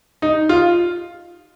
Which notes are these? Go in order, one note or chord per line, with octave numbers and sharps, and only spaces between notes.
D#4
F4